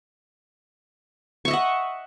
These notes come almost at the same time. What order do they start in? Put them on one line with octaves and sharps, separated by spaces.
C#6 E5 D#5 F#5